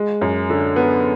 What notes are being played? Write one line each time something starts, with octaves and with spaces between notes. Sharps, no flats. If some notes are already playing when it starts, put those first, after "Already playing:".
Already playing: G#3
F#2
D3
B3